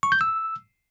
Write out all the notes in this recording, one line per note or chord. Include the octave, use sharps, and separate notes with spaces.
C#6
G6
E6